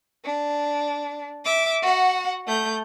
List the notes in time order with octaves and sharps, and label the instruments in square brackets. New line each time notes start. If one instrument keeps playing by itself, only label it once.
[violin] D4
E5 D6
F#4 F#5
A3 G6